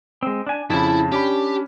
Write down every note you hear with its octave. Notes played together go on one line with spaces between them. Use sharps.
G#3 C4
D4 G#5
F2 C#3 E4 A5 B5
C#4 D4 G4 B5